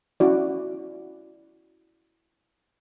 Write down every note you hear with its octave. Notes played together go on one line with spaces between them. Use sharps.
C#4 E4 F#4 D5